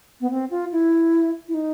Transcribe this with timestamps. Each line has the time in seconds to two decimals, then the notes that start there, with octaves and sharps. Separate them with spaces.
0.21 B3
0.31 C4
0.50 F4
0.72 E4
1.48 E4
1.54 D#4